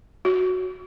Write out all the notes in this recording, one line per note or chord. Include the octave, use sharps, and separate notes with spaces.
F#4